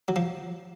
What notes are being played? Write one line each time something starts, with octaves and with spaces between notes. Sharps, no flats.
F#3
F3